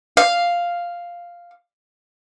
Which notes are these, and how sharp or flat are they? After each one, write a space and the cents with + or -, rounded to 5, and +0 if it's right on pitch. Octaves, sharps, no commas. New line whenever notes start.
F5 +0